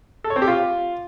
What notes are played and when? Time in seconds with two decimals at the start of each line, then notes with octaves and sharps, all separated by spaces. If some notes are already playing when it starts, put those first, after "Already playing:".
0.24 A4
0.30 C#5
0.36 C4
0.42 G4
0.48 F4